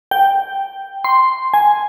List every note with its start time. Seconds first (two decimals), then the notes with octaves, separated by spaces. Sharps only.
0.11 G5
1.04 C6
1.54 G#5